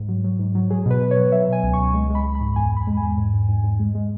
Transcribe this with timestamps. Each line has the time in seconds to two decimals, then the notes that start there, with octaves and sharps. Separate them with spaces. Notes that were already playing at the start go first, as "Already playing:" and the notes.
Already playing: G#2
0.08 F#3
0.24 F#3
0.39 G#2
0.55 F#3
0.70 F#3 G#4
0.86 B2 B4
1.02 B2
1.11 C#5
1.17 F#3
1.32 F#3 E5
1.48 B2 G#5
1.63 C#2
1.73 C#6
1.79 C#2
1.94 G#3
2.10 G#3
2.15 B5
2.25 G#3
2.35 B5
2.41 G#2
2.55 E2 G#5
2.71 E2
2.77 B5
2.87 G#3
2.97 G#5
3.02 E2
3.18 G#2
3.33 G#2
3.49 G#2
3.64 G#2
3.79 G#3
3.95 G#3